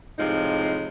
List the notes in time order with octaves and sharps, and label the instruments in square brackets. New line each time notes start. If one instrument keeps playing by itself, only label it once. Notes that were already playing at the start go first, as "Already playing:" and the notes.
[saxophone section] A2 C3 F3 G#3 D#4